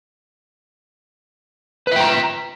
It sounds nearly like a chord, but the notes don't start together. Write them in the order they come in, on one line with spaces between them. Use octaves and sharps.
B4 E5 G5 A#5